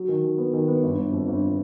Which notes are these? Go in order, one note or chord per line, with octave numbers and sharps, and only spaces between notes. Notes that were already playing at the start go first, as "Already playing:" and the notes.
Already playing: F#3
D#3
D#3
B3
D#3
B3
G1
G1
F2
G1